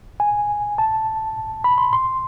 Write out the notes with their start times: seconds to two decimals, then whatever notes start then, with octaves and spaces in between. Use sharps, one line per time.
0.20 G#5
0.78 A5
1.64 B5
1.78 C6
1.93 C6